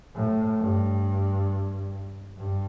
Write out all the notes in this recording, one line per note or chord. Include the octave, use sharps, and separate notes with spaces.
A2
G2
G2